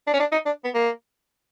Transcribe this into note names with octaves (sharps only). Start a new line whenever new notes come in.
D4
C#4
D4
D#4
D4
B3
A#3